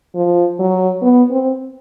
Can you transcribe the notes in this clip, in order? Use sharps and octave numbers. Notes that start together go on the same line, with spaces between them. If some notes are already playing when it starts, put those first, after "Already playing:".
F3
F#3
B3
C4